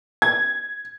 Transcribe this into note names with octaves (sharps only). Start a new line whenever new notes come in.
G#6